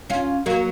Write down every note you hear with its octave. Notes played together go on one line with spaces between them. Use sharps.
C#4 F4
F#3 A#3